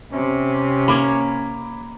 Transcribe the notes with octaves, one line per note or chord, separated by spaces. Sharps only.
C3 C#4
A#3 C#5 B5 D6